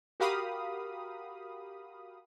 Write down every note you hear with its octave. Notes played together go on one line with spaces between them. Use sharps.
F#4 G4 A#4 F5 B5 D#6